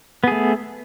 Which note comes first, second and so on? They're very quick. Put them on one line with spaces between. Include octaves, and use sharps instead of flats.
B3 G#4 A3